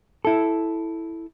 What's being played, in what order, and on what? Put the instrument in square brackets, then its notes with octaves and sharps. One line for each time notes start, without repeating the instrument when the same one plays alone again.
[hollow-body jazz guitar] E4 A4